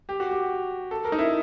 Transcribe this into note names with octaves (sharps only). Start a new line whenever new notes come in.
G4
F#4
G4
A4
A#4
D#4
E4